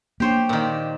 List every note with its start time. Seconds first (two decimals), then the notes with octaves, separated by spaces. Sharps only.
0.20 A#3 D4 G4 C5 C#5
0.49 A#2 D#3